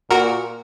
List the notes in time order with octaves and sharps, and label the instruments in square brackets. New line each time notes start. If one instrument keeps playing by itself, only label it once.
[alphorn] A#2 [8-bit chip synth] F#4 A#4